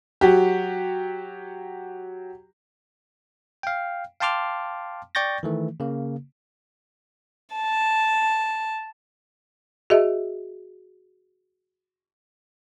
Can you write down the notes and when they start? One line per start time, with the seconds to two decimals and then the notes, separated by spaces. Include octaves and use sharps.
0.21 F#3 F#4 G4
3.63 F5 G5
4.20 F5 G5 A5 C6 D6 F6
5.15 D5 G5 C#6 G6 A6 A#6
5.43 D#3 E3 A3
5.80 C#3 A#3
7.56 A5
9.90 F#4 G#4 D#5 E5